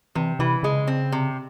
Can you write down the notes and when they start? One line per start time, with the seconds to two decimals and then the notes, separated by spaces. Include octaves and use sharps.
0.15 C3 E3
0.39 C3 E3
0.63 C#3 G#3
0.87 C4
1.12 C3